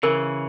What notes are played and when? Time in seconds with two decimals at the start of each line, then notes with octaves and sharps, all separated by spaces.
0.03 C#3 E3 A#4